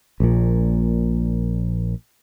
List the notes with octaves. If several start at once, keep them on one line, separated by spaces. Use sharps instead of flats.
A#1 A#2